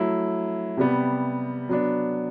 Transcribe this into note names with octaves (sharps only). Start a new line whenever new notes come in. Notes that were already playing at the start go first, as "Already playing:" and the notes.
Already playing: F#3 A3 E4
C3 G3 B3
F#3 B3 D4